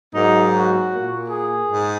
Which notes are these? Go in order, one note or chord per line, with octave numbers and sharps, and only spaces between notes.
G#2 F#3 A#3 D#4
F#4
A#2 A#3
G#4
G#2